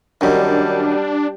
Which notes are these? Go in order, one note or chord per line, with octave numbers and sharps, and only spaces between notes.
F#2 D#3 G3 D4